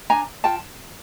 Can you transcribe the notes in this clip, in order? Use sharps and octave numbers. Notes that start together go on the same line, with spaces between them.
D4 G#5 A#5
F4 G5 A5